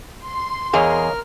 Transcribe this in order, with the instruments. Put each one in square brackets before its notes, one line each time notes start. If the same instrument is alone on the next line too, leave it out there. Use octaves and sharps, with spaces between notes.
[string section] C6
[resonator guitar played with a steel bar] E2 G#4 [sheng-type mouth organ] A#4 F6 [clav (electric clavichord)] C#5 D#5 F5